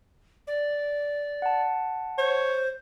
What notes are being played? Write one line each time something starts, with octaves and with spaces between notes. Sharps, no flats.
D5
F#5 A5
C5 C#5